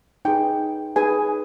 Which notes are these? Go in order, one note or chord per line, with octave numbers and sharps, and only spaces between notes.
D#4 G#4 B4 G5
D#4 G#4 B4 G#5